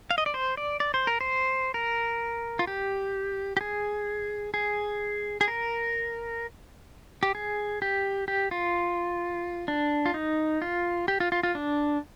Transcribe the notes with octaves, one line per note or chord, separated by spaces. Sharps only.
F5
D#5
D5
C5
D5
D5
C5
A#4
C5
A#4
F4
G4
G4
G#4
G#4
G#4
A#4
G4
G#4
G4
G4
F4
D4
F4
D#4
F4
G4
F4
F4
F4
D4